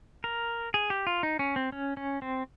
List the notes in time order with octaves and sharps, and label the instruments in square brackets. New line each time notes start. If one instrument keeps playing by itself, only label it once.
[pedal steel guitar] A#4
G#4
G4
F4
D#4
C#4
C4
C#4
C#4
C4